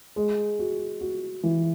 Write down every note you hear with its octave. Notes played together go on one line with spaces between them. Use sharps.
G#3
F#4
F#4
E3